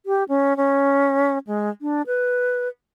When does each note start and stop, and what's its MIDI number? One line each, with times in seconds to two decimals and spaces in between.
0.06 0.24 67
0.29 0.57 61
0.57 1.38 61
1.47 1.70 56
1.82 2.02 62
2.07 2.68 71